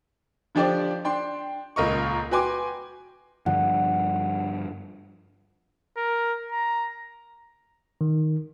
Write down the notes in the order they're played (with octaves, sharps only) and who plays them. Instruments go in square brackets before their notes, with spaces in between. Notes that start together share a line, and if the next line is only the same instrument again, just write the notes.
[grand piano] D3 F3 D4 G4 C5 D5
D4 G5 C6
D#1 C#2 A#4 D#5 C#6
F#4 B4 G5 G#5 C6 D6
[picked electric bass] G2 D3 F3 [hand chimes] F#5
[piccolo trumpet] A#4
A#5
[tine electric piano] D#3